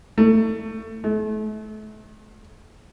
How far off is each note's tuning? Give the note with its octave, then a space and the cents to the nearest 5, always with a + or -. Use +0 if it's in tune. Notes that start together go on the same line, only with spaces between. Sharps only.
A3 +20
A3 -40